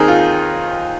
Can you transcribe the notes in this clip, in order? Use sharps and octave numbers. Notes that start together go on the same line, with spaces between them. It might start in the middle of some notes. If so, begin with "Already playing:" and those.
Already playing: D#2 D#3 C4 D#4 G#4 A#4
F4